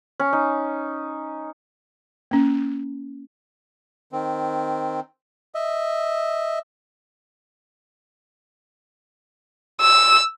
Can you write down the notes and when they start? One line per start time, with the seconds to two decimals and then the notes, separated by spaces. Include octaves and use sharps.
0.20 C#4
0.33 D#4
2.31 A#3 C#4
4.13 D#3 C4
5.55 D#5 E5
9.81 E6